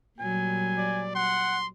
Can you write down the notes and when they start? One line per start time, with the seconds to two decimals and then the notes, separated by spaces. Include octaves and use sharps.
0.19 A#2 F#3 G3 G#5
0.78 D5
1.15 F#5 C6